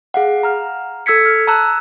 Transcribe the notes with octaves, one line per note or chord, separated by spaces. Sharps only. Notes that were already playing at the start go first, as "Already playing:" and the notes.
G#4 F5 F#5
A#5 F6
A4 E6 G#6 B6 C#7
F6
A5 A#5 E6 F#6